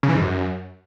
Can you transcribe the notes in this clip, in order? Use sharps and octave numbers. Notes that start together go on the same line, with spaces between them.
C#3
E3
G#2
F#2